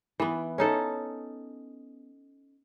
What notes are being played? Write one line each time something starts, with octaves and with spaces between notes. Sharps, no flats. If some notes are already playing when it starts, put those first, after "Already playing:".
E3 B3
C#4 D#4 A4